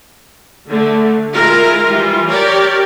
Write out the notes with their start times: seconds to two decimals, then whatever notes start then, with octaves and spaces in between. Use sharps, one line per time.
0.69 D3 A3
1.33 G#3 E4 F4 A#4
1.85 E3 G3 F4
2.28 G4 A#4 C#5 D5